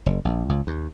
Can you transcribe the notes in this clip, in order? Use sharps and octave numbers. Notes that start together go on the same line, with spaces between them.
F#1
A#1
C#2
D#2